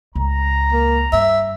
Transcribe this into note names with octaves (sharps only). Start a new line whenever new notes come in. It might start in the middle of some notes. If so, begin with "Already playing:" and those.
C#2 A#5
A#3
G2 E5